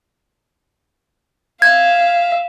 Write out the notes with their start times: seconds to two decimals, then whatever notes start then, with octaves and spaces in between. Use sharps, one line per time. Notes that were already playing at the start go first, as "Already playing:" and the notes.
1.62 E5 F5 G#6